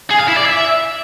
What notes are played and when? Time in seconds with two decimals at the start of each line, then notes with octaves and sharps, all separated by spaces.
0.10 G#4
0.19 F5
0.28 E4
0.37 D5
0.46 E5